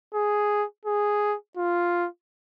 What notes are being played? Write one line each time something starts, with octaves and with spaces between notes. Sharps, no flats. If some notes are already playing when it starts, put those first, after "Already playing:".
G#4
G#4
F4